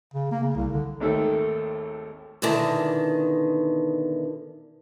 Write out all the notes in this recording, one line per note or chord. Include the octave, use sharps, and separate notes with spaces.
C#3
A#3
C#3
C2
D3
G#1 D#2 D#3 A3 A4
E2 B2 D3 D#3 A5